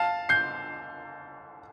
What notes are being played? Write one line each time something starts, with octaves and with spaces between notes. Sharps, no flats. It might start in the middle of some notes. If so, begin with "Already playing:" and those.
Already playing: F5 A5
G6 C7